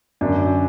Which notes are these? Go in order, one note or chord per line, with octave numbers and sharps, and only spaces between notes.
F#2 D3 D4